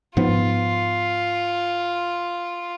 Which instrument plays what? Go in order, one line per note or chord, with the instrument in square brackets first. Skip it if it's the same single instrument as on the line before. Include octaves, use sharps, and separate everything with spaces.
[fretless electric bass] G#2 F3 B3 [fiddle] F4